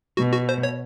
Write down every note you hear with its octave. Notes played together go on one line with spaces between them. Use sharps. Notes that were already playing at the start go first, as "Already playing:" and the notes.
B2 F#4
F#4
C5
C#5